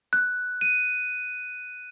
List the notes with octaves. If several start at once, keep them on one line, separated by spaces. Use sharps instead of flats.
F#6
D#7